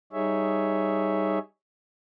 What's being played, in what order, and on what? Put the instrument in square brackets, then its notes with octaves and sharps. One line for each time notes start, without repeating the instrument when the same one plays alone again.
[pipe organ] G3 D#4 G#4 C#5 E5